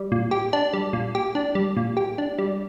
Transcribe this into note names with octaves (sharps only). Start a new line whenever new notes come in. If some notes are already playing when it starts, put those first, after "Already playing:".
Already playing: G3
A#2
G4
D4
G3
A#2
G4
D4
G3
A#2
G4
D4
G3